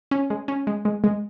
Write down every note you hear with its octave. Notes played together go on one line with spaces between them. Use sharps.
C#4
G#3
C#4
G#3
G#3
G#3